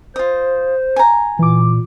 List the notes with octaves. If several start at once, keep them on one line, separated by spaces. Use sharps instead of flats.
F4 C5 D#5
G#5 A#5
A#2 E3 D6